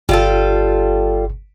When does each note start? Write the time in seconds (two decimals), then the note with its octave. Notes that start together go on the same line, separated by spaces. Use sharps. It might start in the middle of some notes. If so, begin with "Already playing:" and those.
0.09 G1 G3 F4 A4